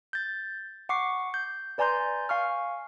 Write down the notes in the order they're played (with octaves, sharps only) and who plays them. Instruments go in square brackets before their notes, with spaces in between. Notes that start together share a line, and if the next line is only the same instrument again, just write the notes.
[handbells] G6 A6
F#5 C#6 D6 C7
G6
B4 D5 G#5 A#5 C6 G6
F5 G#5 C#6 F6